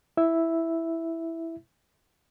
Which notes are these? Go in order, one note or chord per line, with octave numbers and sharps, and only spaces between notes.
E4 E5